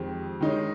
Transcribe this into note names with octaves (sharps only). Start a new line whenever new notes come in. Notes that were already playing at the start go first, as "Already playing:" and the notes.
Already playing: F2 D#3 G#3 C4 G4
D#3 G#3 D#4 G#4 C#5